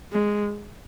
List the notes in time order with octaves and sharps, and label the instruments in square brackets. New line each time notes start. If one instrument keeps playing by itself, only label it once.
[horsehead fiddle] G#3